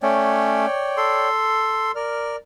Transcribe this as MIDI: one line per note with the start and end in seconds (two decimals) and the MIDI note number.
0.02 0.66 57
0.02 0.66 61
0.02 1.28 73
0.02 1.28 74
0.02 1.28 79
0.97 1.92 69
0.97 1.92 84
1.95 2.36 70
1.95 2.36 74
1.95 2.36 89